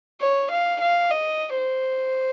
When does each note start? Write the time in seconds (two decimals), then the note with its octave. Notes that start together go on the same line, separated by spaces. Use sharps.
0.20 C#5
0.51 F5
0.81 F5
1.11 D#5
1.57 C5